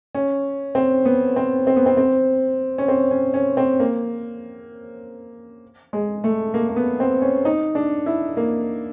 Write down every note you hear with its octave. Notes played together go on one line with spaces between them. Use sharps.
C#4
C4
B3
C4
C4
B3
C4
C4
C#4
C4
C#4
C#4
C4
A#3
G#3
A3
A#3
A#3
B3
C4
C#4
D#4
D4
E4
A#3